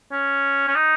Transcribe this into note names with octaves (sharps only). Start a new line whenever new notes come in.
C#4
C#4
D#4